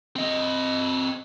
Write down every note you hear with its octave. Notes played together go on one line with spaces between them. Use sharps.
C4 D#5